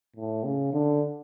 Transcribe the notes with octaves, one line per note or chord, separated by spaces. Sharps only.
A2
C#3
D3